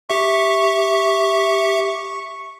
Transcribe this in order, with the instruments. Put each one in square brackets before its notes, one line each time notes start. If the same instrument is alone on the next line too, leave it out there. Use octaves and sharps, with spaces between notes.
[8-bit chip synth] G4 E5 [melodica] C#6